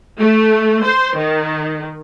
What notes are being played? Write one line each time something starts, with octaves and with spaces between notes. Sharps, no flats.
A3
C5
D#3